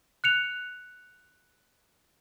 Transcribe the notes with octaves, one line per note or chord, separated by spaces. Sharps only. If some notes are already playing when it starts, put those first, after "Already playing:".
F#6 C#7 F7